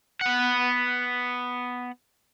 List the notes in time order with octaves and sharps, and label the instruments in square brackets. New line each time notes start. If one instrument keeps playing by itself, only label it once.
[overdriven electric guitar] B3 F#5